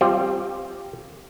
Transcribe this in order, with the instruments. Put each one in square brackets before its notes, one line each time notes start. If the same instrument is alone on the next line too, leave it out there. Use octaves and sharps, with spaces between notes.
[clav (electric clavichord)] G3 C4 F4